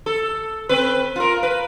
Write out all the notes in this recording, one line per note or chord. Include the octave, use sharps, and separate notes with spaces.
A4
C4 B4
F4 A#4
B4